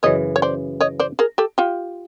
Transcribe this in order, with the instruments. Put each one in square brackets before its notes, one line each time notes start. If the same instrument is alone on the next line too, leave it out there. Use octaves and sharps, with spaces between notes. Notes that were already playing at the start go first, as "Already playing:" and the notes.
[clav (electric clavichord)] F#2 C#3 E3 [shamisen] C#5 D#5
[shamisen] C#5
C5 D5
C#5 D#5
C5 D5
G#4 A#4
G4 A4
F4 G4